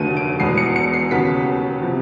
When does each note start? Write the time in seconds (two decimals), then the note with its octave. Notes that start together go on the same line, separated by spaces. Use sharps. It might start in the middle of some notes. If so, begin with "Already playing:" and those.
Already playing: F1 D#2 D3 F#3 A3 D#7
0.17 D7
0.40 E1 E2 B2 G#3 B3 C7
0.57 C#7
0.76 C#7
0.93 C7
1.11 D#2 C#3 F#3 B3 B6
1.83 C3 F3